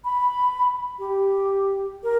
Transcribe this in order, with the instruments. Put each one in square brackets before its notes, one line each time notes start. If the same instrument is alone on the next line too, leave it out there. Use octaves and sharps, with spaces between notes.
[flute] B5
G4
A#4